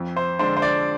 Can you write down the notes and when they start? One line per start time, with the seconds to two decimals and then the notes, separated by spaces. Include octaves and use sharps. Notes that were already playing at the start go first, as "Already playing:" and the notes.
Already playing: F2
0.16 C5
0.39 D3 G#3 D4 C5
0.57 C5
0.62 D5